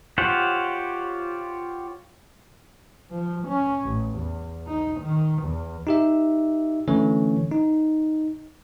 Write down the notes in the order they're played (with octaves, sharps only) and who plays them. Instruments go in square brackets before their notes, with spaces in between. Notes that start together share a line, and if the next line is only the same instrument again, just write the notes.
[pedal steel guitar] F4 G4 C5 C#5 F#5
[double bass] F3
C#4
A1
E2
D#4
D#3
E2
[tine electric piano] D#4 G4 E5
D3 E3 A3 C#4 C#5
D#4